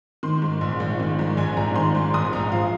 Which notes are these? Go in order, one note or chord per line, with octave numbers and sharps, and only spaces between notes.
D#3 C6
G#2
A#1
A#1
D#3
G#2
A#1 G#5
A#1 A#5
D#3 C6
G#2
A#1 D#6
A#1 A#5
F3 F5